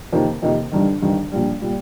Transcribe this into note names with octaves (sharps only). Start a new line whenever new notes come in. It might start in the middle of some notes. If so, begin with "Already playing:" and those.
F2 C3 D#3 A#3 D#4
F2 C3 D#3 A#3 D#4
G1 G2 D#3
G1 G2 D#3
A#1 A#2 G3
A#2 G3